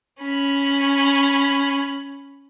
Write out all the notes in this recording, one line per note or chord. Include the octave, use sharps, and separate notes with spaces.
C#4 B5